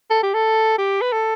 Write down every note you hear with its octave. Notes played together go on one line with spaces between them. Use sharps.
A4
G4
A4
G4
B4
A4